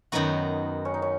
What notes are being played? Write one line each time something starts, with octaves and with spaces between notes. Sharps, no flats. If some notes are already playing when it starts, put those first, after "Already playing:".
F#2 D#3 F#3 B3 D#4 F#4
C#4
D#4
C#4